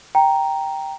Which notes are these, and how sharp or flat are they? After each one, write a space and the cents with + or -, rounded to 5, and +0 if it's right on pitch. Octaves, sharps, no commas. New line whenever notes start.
G5 +0 A#5 +0